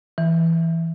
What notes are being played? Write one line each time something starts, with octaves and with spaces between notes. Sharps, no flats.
E3